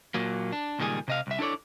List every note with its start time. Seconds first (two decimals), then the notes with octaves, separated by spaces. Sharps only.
0.14 A#2 F#3 A#3
0.52 D4
0.79 C#2 A#2 D#3 G3 G#4
1.08 C3 D#5 F5
1.27 C2 E5
1.39 D4 E4 A4 C#5 D5